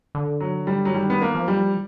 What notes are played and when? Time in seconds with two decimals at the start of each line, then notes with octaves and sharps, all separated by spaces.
0.15 D3
0.40 F#3
0.67 G3
0.85 F#3
0.94 D#3 G3
1.10 B3
1.22 A#3
1.35 F3
1.48 G3